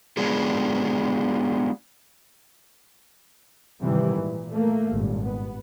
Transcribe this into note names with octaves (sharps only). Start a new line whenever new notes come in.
G#3 B3 D4 F4 G#4
G#2 C3 D#3 E3 G3
A#2
A3 A#3
G#1 G2 A#2
B3